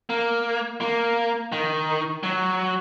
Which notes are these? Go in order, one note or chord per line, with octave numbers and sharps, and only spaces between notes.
A#3
A#3
D#3
F#3